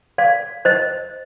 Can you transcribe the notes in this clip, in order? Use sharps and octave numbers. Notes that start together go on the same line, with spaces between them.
D5 F5
C5 D#5